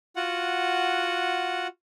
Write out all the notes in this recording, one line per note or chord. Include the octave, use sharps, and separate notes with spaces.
F4 F#4 F#5